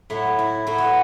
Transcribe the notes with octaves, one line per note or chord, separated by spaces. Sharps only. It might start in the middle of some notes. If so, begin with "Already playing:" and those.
A2 F#3 E4
E4
A2 F#3 E4
F#4